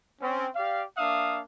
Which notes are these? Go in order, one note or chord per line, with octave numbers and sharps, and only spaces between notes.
C4 C#4
G4 D5 F5
A#3 D4 E5 F5 D#6